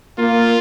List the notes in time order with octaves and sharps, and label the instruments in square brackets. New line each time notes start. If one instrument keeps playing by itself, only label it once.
[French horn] A#3 [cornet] F4